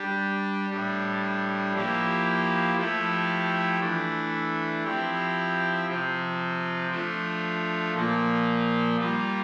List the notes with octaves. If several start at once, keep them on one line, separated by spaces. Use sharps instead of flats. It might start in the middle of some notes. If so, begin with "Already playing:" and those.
Already playing: G3 D4 G4
A2 G3 D4
F3 A#3 E4 G4
F3 A3 E4 G4
E3 A3 D4
F3 C4 E4 G4
C3 F3 C4 F4
F3 A3 D4 F4
A#2 F3 A#3 F4
G3 A#3 F4